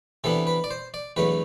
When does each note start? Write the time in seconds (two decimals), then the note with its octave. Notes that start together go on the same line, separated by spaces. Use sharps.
0.24 C3 E3 B3 D4 A4
0.47 B4
0.64 D5
0.71 C5
0.94 D5
1.17 E2 D3 F#3 A3 B4